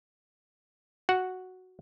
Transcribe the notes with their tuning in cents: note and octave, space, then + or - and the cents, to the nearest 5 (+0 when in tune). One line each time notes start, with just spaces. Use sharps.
F#4 +0 F#5 +0